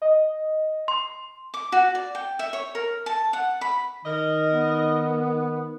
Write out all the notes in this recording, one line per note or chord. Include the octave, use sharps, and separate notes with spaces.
D#5
C6
D6
F#4
D5
G5
E5
C#5
A#4
A5
F#5
B5
D#3 A#4 D#5
B3